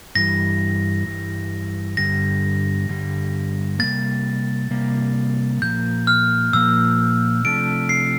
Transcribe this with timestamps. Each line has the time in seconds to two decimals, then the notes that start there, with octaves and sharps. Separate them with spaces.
0.15 G2 E3 G3 A#6
1.06 G2 E3 G3
1.97 G2 D3 G3 A#6
2.89 G2 D3 G3
3.79 C3 G3 A#3 A6
4.71 C3 G3 A#3
5.62 A#2 F3 A#3 G6
6.07 F6
6.53 A#2 F3 A#3 E6
7.44 C3 F3 A3 D4 D7
7.89 C7